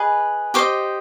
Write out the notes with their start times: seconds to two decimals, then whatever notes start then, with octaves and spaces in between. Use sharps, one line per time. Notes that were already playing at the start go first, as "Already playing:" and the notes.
Already playing: G#4 B4 D#5
0.54 G4 C5 D#5 D6